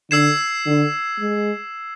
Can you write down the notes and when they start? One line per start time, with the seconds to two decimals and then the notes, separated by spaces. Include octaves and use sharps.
0.11 D3 E6 G#6 C7 E7
0.66 D3
1.19 G#3